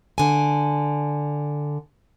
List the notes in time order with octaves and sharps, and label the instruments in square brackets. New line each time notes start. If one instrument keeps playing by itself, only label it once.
[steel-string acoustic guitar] D3 G#5